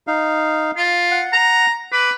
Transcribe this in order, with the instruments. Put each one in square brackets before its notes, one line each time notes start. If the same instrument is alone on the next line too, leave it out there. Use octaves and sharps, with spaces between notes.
[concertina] D#4 F5
[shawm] F4
[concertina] F#5
[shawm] A#5
[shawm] B4 [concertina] D6